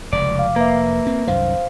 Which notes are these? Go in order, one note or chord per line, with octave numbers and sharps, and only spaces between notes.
F1 C#2 D5
F5 D6
A#3 B4 E5
C4
C2 F#2 D#3 C5 F5